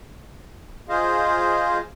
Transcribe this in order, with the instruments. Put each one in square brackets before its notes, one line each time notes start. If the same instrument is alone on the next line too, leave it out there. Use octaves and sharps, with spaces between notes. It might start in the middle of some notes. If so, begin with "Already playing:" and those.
[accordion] F4 G#4 C5 D#5 F5